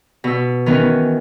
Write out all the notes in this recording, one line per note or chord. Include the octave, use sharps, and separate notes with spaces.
B2 E6
D#3 E3 B3 C#4